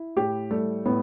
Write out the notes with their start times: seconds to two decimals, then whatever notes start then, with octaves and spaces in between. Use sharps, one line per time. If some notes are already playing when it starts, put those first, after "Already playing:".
Already playing: E4
0.17 A2 G4
0.51 G3 A3
0.86 A2 B3